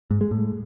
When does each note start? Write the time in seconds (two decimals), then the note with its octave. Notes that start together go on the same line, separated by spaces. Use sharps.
0.11 G#2
0.21 G#3
0.31 A2